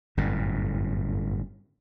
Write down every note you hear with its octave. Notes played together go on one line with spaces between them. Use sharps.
G1 F#2 A2